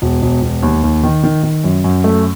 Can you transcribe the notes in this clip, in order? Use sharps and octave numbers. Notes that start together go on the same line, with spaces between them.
E1
E1
E1
D#2
D#2
D#3
D#3
D#3
F#2
F#2
A3